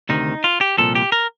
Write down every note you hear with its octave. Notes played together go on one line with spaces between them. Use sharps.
D2 C3 D#3 D#4
F4
G4
C2 A#2 F3 A4
G4
A#4